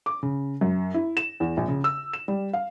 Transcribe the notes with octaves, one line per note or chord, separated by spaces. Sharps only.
D6
C#3
F#2
E4
E7
E2
A#1
C#3
E6
E7
G3
F5